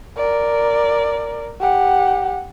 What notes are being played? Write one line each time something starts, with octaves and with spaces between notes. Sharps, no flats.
A#4 D5
G4 F#5